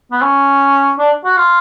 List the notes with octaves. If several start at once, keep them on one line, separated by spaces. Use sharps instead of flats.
B3
C#4
D4
F#4
F4